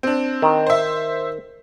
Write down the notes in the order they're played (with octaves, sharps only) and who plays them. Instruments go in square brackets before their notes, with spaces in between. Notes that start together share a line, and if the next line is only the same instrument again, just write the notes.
[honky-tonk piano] C4 D4
[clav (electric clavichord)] D#3
[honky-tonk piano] C5 E5